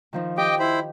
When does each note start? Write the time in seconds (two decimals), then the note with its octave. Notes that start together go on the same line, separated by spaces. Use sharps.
0.13 D#3 F3 D#4
0.38 G4 D#5 G5 D6
0.59 E4 C5 B5